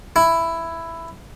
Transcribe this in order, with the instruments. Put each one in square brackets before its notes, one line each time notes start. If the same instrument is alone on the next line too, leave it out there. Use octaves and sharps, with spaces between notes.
[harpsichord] E4